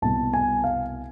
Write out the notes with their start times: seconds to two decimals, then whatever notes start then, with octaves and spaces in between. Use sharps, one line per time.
0.02 C2 B2 A5
0.34 G#5
0.64 F5